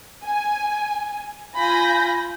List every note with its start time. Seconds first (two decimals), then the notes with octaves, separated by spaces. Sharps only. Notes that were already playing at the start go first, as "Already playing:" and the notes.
0.25 G#5
1.58 F4 G#5 B5 G6 A#6